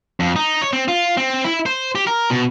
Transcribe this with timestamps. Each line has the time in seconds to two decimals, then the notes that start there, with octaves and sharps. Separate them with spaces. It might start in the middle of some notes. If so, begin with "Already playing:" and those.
0.20 F2
0.36 D#4
0.62 C#5
0.73 C4
0.88 F4
1.17 C4
1.44 E4
1.66 C5
1.95 G4
2.07 A#4
2.30 B2